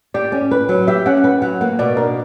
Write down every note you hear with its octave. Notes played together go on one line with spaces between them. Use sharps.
G4 D5
C#4
B4
F#3
G4 E5
C#4 F#5
F#5
B4 G5
F#3 F#5
A#3 F#5
B2 D5
D4 A#4